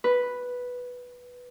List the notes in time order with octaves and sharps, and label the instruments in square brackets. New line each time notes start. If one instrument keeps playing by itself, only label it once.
[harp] B4